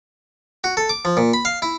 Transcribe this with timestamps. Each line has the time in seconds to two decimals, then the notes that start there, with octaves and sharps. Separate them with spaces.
0.64 F#4
0.77 A4
0.89 D6
1.05 F3
1.17 A#2
1.33 B5
1.45 F5
1.62 E4